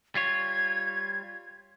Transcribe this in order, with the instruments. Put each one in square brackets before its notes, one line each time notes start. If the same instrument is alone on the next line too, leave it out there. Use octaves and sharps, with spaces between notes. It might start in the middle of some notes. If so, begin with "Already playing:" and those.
[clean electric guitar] G3 F4 C#5 [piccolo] G#6